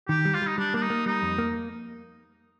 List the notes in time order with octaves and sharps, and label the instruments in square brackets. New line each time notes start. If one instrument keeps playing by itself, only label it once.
[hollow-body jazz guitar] D#3 [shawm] G4
[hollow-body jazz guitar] G3
[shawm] F4
[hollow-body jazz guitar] G3 [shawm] D#4
[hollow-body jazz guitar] G3 [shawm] D4
[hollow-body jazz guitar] A#3 [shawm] D4
[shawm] D#4
[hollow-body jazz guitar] A#3
[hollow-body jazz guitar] G3 [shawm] D#4
[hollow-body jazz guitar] F2
A#3